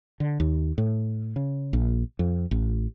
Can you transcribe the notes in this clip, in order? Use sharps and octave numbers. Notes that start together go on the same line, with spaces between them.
D3
D#2
A2
C#3
A#1
F2
A1